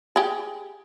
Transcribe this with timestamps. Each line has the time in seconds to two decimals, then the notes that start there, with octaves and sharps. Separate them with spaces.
0.16 G4 G#4